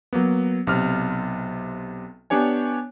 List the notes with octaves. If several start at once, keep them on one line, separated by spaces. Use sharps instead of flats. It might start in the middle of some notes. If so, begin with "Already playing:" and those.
F#3 A#3 B3
B1 C3 F6
B3 D4 G4 C#5 G#5